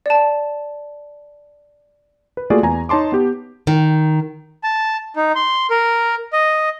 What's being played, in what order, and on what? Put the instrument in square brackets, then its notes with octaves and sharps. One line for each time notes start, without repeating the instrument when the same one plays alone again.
[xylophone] D5 A5
[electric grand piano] B4
A3 A#3 F4 F#4 G#4 D5
E2 G#5 A#5
D#4 C#5 A5 C6 D6
B3 G4
[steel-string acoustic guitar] D#3
[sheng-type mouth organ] A5
D#4
C6
A#4
D#5